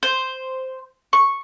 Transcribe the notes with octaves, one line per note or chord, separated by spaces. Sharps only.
C5
C#6